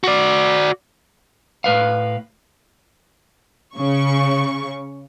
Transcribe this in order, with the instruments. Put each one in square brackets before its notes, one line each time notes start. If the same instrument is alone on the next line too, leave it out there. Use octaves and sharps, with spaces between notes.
[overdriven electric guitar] F#4 D5
[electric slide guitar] A2 B4 F5
[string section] C#3 C#6